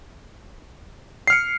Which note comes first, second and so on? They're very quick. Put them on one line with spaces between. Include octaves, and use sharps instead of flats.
C7 F6 C#7